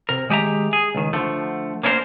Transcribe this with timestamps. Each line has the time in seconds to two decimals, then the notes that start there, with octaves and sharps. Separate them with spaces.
0.09 C3 A#4
0.29 D#3 G#3 G4 E5 A#5
0.73 G#4
0.95 C#2 D#3
1.13 D3 F3 A3
1.83 A#3 C#4 D4 E4 A#4 C5